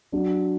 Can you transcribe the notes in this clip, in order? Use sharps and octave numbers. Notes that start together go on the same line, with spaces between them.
F#3 D4 F#4